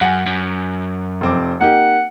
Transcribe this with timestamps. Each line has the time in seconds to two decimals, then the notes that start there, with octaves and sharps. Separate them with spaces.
0.01 F#2 F#5 G#5
0.26 F#2
1.21 F1 C4 D6
1.61 A#3 D#4 G4 F#5